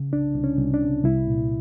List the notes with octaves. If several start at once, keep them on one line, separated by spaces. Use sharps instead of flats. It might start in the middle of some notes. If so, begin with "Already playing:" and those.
Already playing: C#3
C2 D4
C2
C#4
C2
D4
C3
C2 E4
A#2